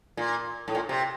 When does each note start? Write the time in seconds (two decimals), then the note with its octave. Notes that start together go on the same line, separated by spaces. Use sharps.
0.17 A#2
0.68 A2
0.75 A#2
0.89 C3